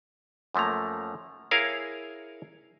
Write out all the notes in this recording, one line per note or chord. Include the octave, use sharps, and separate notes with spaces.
F#2 F3 A3 A#3 A#5
E4 G#4 A#4 C#5 F5